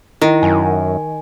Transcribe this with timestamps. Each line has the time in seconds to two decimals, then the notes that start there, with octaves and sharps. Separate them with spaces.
0.22 D#3 E4
0.43 F#2 G#5